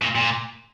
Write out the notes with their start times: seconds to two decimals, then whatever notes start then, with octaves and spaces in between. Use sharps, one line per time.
0.02 A#2
0.15 A#2